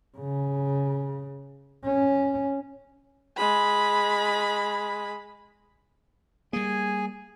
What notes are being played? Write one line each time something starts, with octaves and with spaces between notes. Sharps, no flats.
C#3
C#4
G#3 B5
G3 A#3 G#4 G#5